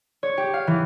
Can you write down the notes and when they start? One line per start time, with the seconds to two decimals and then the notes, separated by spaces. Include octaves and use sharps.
0.23 C#5
0.37 G4
0.54 F5
0.67 E3